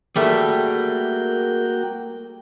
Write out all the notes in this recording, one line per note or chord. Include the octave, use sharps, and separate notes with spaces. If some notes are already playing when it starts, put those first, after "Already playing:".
G3 A3 A#3 F#4 G#4 A#4 E5 G5